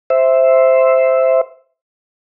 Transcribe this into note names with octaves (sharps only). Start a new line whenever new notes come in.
C5 E5